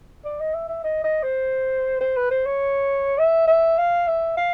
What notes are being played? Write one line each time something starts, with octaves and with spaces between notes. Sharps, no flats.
D5
D#5
E5
E5
D#5
D#5
C5
C5
B4
C5
C#5
E5
E5
F5
E5
F5